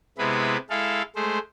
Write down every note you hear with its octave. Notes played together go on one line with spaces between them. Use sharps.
C3 G#3 B3 E4 B4
G#3 E4 A4 F5
G#3 A3 C5